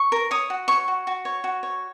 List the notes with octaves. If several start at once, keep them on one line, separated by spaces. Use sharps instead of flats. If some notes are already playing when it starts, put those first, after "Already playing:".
Already playing: C#6
A#4
C#5 D#6
F#4
C#5 C#6
F#4
F#4
C#5
F#4
C#5